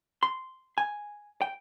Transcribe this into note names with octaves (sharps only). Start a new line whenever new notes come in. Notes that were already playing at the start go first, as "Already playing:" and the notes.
C6
G#5
G5